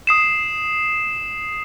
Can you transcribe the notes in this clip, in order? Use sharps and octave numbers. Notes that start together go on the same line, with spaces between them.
D#6 C7 E7